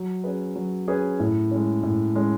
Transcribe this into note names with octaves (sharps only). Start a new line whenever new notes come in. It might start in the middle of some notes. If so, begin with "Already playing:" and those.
Already playing: F#3
C#4 G#4 B4
F#3
C#4 G#4 B4
A2
G#3 C#4
A2
G#3 C#4